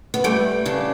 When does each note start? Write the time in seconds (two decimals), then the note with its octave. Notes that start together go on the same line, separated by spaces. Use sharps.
0.14 B3
0.24 G3 A3
0.66 C#3 D4